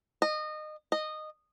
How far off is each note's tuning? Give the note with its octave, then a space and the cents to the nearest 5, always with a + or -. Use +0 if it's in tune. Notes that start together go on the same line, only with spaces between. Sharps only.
D#5 -25
D#5 -15